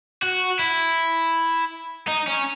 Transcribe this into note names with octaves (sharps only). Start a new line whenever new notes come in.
F#4
E4
D#4
C#4